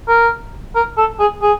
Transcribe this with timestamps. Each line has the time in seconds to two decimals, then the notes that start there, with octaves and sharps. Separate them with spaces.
0.08 A#4
0.75 A#4
0.97 A4
1.20 G#4
1.42 G#4